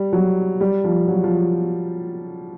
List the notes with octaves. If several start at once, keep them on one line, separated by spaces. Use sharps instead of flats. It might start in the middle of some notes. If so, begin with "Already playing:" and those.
Already playing: G3
F#3
G3
F3
F#3
F3